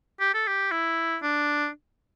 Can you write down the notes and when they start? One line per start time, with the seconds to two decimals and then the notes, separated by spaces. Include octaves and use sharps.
0.20 G4
0.34 A4
0.47 G4
0.71 E4
1.22 D4